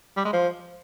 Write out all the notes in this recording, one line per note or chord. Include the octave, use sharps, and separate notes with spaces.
G3
G#3
F3